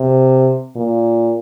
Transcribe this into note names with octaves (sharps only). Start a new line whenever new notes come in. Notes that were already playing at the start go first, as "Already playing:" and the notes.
Already playing: C3
A#2